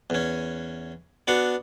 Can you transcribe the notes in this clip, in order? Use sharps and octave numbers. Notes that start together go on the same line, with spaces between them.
E2 C#4
B3 D4 F#4 F#5